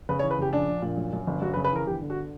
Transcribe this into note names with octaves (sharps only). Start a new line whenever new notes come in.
C#3 B4
C#5
E3
B4
C#3 G4
A#1 D4
A#1
A#2
F#2
F#2
G1
F#2 F#4
B4
C#3
B4
E3 A#4
G1 G4
D3
F#4